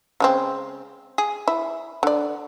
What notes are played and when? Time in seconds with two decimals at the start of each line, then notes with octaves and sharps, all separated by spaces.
0.20 C#3 G#3 C4
1.18 G#4
1.48 E4
2.03 D3 D5